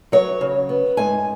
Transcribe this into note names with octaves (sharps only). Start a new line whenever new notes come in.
F#3 C#5
C#3
B3
G#2 G#5